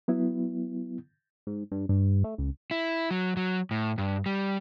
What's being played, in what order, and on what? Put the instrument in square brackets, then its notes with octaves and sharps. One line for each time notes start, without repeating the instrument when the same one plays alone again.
[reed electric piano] F#3 B3 E4
[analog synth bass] G#2
G2
G2
A3
C#2
[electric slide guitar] E4
F#3
F#3
A2
G2
G3